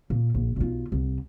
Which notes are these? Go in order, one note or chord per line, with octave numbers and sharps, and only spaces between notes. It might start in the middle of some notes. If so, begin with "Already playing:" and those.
A#2
A#1
B1 F4
C2